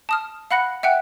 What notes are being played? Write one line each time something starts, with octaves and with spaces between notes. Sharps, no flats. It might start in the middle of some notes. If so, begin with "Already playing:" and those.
A5 D#6 F6
F5 F#5 B5 F#6 A#6 C#7
E5 F#5 G5 F#6